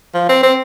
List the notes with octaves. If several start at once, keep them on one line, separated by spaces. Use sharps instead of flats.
F3
C4
C4